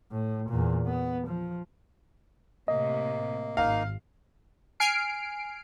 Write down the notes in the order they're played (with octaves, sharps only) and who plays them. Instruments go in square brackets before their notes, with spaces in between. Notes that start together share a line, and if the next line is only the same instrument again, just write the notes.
[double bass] A2
E2 A#2
B3
F3
[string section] A2 C3 [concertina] A#3 [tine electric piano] D#5
[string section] G#1 [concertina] A#3 D#4 [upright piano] F5
[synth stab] G#5 F6 C7 D7